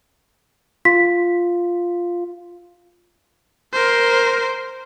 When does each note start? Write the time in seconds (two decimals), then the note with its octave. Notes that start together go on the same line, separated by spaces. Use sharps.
0.85 F4 B6
3.73 A#4 C5